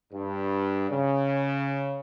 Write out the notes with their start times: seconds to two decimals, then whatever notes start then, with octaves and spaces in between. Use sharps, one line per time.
0.13 G2
0.90 C#3